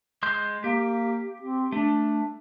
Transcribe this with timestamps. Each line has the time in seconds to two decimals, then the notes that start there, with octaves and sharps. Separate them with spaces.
0.23 G#3 C6 G6
0.64 A#3 G4
1.42 C4
1.72 A3 D4